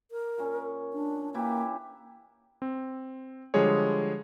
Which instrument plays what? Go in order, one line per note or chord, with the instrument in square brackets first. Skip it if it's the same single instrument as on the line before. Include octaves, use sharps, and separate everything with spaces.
[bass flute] A#4
[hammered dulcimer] A#2 C#4
[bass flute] D4
[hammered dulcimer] E3 E4 G4 [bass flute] A#3
[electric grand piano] C4
D3 F3 G3 G#3 G#4 C#5